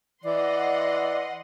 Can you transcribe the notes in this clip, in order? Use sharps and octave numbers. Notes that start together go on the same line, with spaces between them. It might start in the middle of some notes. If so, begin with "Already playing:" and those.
E3 D5 D#5 F#5 C6